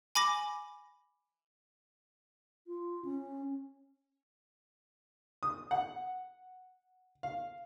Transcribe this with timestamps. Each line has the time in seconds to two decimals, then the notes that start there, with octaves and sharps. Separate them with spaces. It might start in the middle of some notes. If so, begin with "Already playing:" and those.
0.15 G#5 B5 D6 A#6
2.67 F4
3.05 C#4
5.43 D#6
5.71 F#5
7.23 F5